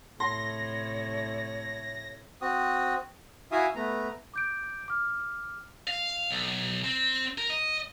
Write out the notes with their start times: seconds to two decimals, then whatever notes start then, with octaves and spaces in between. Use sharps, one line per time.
0.20 A2 C3 A3 C#5 C6 A#6
2.41 C4 F#4 D#6
3.52 E4 F#4 E5 F5 G#5 D#6
3.76 A3 B3 A#5
4.34 D6 G6 D7
4.88 D6 F6
5.88 F5
6.31 B1
6.84 C4
7.38 A#4
7.50 D#5